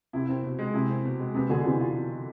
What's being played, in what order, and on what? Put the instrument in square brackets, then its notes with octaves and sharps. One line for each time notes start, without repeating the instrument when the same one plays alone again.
[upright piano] C3 [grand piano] E4
[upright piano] C3 [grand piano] C4
[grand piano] B2
G#3
[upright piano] C3 [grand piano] E4
[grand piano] C4
B2
G#3
[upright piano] C3 [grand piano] B3
[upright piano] B2 D3 [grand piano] G#4
[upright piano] C3 E3 [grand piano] B3
[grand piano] F4